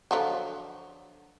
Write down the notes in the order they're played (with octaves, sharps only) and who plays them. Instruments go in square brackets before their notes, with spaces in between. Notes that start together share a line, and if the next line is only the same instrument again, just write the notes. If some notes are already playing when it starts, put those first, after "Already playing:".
[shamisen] D3 F3 F#3